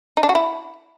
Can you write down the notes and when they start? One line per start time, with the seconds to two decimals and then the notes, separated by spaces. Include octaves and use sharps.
0.17 D#4
0.23 D4
0.29 F#4
0.35 E4